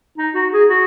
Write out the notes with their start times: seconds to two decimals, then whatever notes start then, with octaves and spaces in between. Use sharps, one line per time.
0.18 D#4
0.35 F#4
0.52 G#4
0.70 F#4